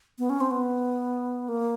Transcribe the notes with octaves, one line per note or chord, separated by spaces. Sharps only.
B3
C#4
C4
B3
A#3